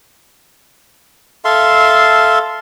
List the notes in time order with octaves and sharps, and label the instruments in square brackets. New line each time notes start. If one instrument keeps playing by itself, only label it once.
[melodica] A4 E5 F5 C6